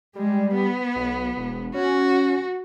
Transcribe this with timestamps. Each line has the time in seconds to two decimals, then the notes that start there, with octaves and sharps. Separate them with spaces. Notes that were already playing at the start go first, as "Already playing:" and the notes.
0.15 G3 G#3
0.54 B3
0.96 B1
1.37 E1
1.74 C#4 F#4